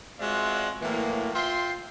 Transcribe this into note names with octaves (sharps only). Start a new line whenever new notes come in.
G#3 C4 F4 F#4 D5 E5
A2 E3 F#3 A#3
F4 E5 G5 C6